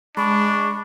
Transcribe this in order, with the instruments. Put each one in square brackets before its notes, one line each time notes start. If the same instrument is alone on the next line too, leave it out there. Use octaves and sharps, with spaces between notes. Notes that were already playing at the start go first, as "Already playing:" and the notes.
[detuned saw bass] G#3 [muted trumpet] D4 [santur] B5 [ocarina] C#6